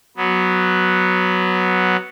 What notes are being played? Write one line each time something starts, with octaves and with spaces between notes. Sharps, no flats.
F#3 B3